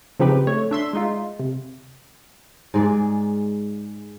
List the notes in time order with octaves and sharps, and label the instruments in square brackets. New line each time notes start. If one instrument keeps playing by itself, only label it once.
[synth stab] C#3 F3 C4 D#4 G4 B4
A3 C#5
D4 E5 C6
G#3 D#4 F4
C3
[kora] G#2 G#3 D5